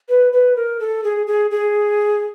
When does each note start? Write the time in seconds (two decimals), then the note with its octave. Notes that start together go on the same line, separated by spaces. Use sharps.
0.09 B4
0.33 B4
0.56 A#4
0.80 A4
1.04 G#4
1.27 G#4
1.51 G#4